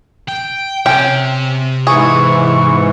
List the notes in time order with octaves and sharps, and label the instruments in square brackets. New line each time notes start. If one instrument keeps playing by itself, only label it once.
[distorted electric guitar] G5
[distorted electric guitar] C3 [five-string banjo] C#4 G5
[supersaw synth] G#2 E3 [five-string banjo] G#4 [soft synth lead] C#6